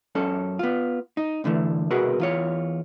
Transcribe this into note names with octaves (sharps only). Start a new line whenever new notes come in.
F#2 C#4 A4
B3 F4
D#4
G2 D3 E3 A3
C2 B2 F#4 G#4 A#4 B4
E2 F4 C#5